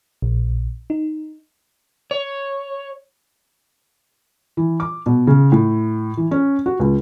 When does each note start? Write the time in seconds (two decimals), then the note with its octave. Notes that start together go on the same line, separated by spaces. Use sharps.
0.22 A#1
0.90 D#4
2.11 C#5
4.57 E3
4.80 D6
5.06 B2
5.27 C#3
5.52 A2
6.17 E3
6.31 C#4
6.66 F#4
6.80 C#2